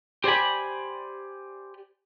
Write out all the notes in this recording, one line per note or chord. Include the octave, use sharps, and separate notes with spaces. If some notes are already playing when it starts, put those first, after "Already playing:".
G4 C5 D5 G#5 B5